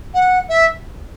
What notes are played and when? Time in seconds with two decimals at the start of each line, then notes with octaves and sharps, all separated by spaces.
0.14 F#5
0.49 E5